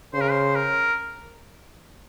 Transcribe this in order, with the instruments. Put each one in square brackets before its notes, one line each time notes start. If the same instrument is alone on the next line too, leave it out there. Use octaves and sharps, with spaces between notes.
[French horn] C#3 [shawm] C5
[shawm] A#4
C5
A#4